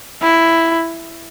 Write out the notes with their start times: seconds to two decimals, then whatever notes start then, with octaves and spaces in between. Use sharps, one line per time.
0.22 E4